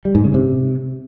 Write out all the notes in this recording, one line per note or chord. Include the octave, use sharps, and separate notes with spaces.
G3
G#2
C#3
C3